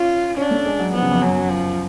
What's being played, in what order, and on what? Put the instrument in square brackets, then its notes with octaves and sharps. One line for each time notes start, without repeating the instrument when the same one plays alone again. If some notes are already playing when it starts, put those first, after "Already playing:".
Already playing: [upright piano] C#4 [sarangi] F4
[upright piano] C#4 [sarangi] D4
[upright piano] A3
G#3
F#3
[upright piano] F3 [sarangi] B3
[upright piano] C#3
F2
[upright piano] F#2 [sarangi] F#3
[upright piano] F#2
[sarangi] F3